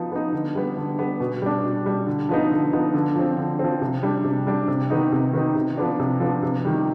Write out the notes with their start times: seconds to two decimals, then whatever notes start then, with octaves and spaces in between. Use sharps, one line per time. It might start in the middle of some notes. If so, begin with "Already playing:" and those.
Already playing: F3 B3 D#4
0.12 B3 D#4
0.32 D3
0.55 G3 B3
0.77 D3
0.99 G3 B3
1.20 B2
1.42 G3 D4
1.64 B2
1.86 G3 D4
2.07 D3
2.29 F3 B3 D#4
2.50 D3
2.73 F3 B3 D#4
2.94 D3
3.16 F3 C4
3.37 D3
3.59 F3 C4
3.81 C3
4.03 G3 D4
4.24 C3
4.47 G3 D4
4.68 C3
4.90 D#3 B3 D#4
5.12 C3
5.33 D#3 B3 D#4
5.55 C3
5.77 F3 B3 D4
6.00 C3
6.20 F3 B3 D4
6.43 C3
6.65 D#3 G3